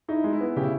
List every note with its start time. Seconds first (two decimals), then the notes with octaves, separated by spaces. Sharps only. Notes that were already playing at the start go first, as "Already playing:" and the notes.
0.08 D#4 E4
0.24 G#3
0.33 E4
0.41 B3
0.56 C#3 G4
0.63 E4